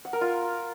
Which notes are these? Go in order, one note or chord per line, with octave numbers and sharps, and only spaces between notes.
F#5
A#4
F4